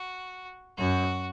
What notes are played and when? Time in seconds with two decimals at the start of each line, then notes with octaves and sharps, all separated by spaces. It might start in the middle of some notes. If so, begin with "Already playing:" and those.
Already playing: F#4
0.77 F#2 F#4